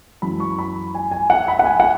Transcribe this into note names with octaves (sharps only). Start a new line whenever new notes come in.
F#2 E3 G#3 B5
C#6
B5
G#5
G#5
F#5
B5
F#5
G#5
F#5